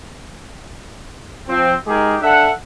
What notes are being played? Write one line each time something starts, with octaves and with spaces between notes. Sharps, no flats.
F3 C4
G#3 D#4 G4 G#4 A#4
D4 A4 E5 F#5